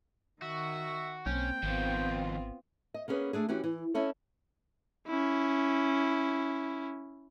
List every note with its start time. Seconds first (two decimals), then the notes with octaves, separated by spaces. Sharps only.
0.42 D#3 F#4 E5
1.26 B1 A#3 C4 C#4 G5
1.63 G#1 D#3 F3 B3 C4 F4
2.94 D#5
3.08 A#3 B3 C#4 G#4 B4
3.33 A3 D4 G#4
3.49 E3 C#4 F#4 G4
3.64 E3
3.94 C#4 D#4 E4 A4 C#5
5.08 C#4 E4